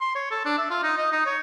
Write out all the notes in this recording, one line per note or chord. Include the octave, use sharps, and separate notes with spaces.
C6
C#5
A4
D4
E5
F4
D#4
D#5
D#4
C#5